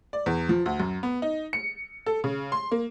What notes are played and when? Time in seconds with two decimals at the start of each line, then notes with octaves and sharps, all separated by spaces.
0.13 D5
0.26 E2
0.49 F3
0.66 D2
0.80 F#2
1.03 B3
1.22 D#4
1.53 C#7
2.06 A4
2.24 C#3
2.52 C6
2.72 A#3